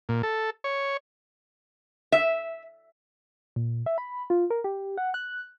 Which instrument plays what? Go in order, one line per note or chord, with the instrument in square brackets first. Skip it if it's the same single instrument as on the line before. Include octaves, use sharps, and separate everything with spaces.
[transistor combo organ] A#2
A4
C#5
[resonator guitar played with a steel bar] E5
[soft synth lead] A#2
E5
B5
F4
A#4
G4
F#5
F#6